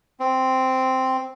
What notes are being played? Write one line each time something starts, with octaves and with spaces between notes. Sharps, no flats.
C4